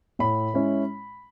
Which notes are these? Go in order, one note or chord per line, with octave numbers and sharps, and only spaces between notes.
A2 B5
G#3 C#4 E4